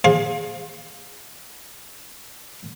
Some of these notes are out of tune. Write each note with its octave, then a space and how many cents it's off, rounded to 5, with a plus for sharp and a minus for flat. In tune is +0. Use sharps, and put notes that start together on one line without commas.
G#4 -10 C5 +30 F5 +25